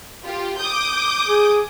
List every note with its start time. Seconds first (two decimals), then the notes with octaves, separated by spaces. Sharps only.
0.25 F4 G4
0.60 D6 D#6 G6
1.28 G#4